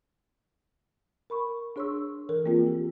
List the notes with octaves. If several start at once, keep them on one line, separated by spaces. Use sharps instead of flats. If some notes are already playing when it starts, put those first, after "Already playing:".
A#4 B5 C#6
D4 G#4 C#5 C6 C#6 E6
E3 A4 A#4
E3 F3 A#3 C4 F4 G#4
G4